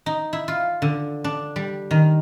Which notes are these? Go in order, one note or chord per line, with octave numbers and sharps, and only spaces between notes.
D#4
E4
F4
D3
D4
G3
D#3